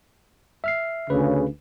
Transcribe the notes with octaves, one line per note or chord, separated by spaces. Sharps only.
E5 F6 C7
D2 C#3 B4